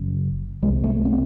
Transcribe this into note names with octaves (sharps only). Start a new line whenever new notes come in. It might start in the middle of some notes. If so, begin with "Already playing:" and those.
Already playing: F#1 F#2 C#3
C2 C3 G#3
A3
C4